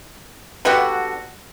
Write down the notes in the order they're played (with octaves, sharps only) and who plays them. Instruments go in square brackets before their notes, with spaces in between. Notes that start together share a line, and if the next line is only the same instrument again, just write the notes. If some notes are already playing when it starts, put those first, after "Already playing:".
[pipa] D3 G3 B3 F#4